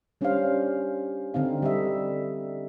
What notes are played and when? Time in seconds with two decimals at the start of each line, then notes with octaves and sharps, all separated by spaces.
0.21 G3 C#4 D4 G4 C5 F5
1.34 D3 C4 D#4 F5
1.62 G3 D#5 E5